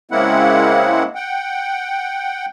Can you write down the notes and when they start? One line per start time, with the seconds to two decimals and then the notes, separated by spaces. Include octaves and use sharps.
0.11 C#3 G#3 A#3 C4 E4 F#5
1.15 F#5 G5